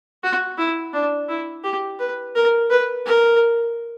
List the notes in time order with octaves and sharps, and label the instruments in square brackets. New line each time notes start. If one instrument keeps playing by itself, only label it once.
[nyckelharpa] F#4
E4
D4
E4
G4
B4
A#4
B4
A#4